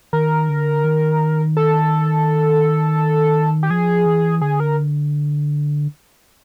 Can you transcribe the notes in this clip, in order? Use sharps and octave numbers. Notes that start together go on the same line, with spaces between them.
D#3 A#4
D3
D#3
A4
G4
F3 G#4
E3
D3 G#4
A#4